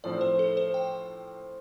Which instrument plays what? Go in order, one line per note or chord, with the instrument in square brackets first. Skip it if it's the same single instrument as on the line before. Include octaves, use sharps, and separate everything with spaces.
[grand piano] A2 F3 C4 [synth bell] D5
[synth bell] C5
A4
C5
G5